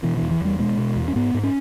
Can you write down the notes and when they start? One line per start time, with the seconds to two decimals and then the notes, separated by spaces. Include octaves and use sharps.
0.03 B2 E3
0.17 E3
0.22 E2
0.31 E3
0.41 E2 G3
0.59 B2 G#3
0.78 B2
0.96 E2
1.08 C#4
1.16 G#2 B3
1.34 G#2
1.44 C#4